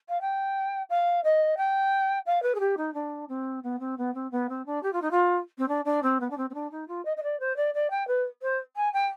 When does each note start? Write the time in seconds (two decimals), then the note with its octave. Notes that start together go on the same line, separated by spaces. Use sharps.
0.08 F5
0.21 G5
0.89 F5
1.24 D#5
1.57 G5
2.26 F5
2.42 B4
2.54 G#4
2.59 G4
2.77 D#4
2.94 D4
3.28 C4
3.63 B3
3.79 C4
3.98 B3
4.14 C4
4.31 B3
4.49 C4
4.66 D4
4.83 G4
4.93 F4
5.01 D#4
5.11 F4
5.58 C4
5.68 D4
5.85 D4
6.02 C4
6.20 B3
6.30 D4
6.37 C4
6.50 C4
6.54 D4
6.71 D#4
6.88 F4
7.05 D#5
7.16 D#5
7.23 D5
7.39 C5
7.56 D5
7.74 D5
7.90 G5
8.07 B4
8.42 C5
8.76 G#5
8.93 G5